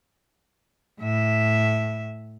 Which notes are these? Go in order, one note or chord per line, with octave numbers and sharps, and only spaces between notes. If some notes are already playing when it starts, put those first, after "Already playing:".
A2 E5